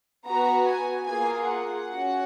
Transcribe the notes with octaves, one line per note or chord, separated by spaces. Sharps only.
B3 F#4 A#5
G#5
A#3 F4 G#4 G#5
F#5
C#4 F#4